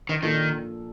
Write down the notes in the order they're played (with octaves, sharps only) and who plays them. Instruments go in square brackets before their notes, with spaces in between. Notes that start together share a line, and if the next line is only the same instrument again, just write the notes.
[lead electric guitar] D#3
[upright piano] A#2 F3 A#3 D4 A4 [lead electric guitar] D#3